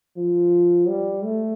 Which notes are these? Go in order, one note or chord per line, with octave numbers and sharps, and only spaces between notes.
F3
G3
A3